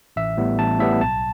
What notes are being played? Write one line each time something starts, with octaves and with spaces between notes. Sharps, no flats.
A1 E5
A2 G3 B3
A1 A5
A2 G3 B3 E5
B1 A5